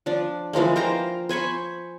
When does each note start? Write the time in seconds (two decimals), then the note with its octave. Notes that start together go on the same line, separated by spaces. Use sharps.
0.06 F3 D4
0.53 E3 F3 G#3 A#3
0.76 C5 F5 G5 A#5
1.29 C5 G#5 B5 C#6